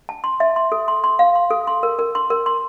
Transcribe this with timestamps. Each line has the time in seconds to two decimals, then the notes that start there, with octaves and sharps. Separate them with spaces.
0.09 A5
0.24 C6
0.40 E5
0.56 C6
0.72 A4
0.88 C6
1.04 C6
1.19 F5
1.35 C6
1.51 A4
1.67 C6
1.83 A#4
1.99 A#4
2.15 C6
2.30 A#4
2.46 C6